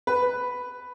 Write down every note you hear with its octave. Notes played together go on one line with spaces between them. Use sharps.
B4